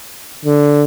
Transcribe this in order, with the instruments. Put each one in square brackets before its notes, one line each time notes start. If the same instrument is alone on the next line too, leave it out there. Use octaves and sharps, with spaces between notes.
[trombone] D3